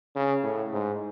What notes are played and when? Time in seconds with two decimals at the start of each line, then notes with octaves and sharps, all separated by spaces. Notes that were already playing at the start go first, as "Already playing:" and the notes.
0.15 C#3
0.43 A2
0.72 G#2